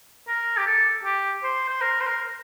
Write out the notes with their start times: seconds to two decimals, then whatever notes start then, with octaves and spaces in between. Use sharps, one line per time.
0.28 A#4
0.57 G4
0.66 A4
1.04 G4
1.43 C5
1.69 C5
1.81 A#4
2.01 C5
2.07 A#4